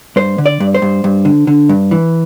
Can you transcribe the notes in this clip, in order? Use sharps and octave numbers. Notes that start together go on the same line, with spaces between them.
G2 C5
D3
D5
G2
C5
G2
G2
D3
D3
G2
E3